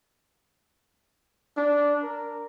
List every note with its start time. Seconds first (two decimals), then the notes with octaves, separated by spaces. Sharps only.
1.57 D4
2.03 A#4